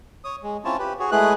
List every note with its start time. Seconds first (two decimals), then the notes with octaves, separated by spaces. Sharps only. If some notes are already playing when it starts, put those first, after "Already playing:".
0.24 C#5 D#6
0.43 G#3
0.65 C4 C#4 E4 F4 C#5 A5
0.79 G4 B4
0.99 F#4 G#4 C#5
1.11 G#3 A3 E4 G#4 B4 F#6